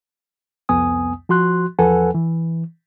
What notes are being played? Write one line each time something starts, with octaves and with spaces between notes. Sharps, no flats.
C2 F2 B3 G#5 D#6
F3 F#4 C6 F#6
E2 F3 A4 B4 F#5 G#5
E3